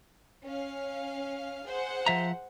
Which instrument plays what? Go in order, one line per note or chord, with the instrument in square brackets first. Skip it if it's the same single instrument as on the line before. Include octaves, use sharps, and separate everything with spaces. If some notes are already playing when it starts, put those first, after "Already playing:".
[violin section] C#4 F5
G#4 C5 F#5
[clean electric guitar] F3 E5 A#5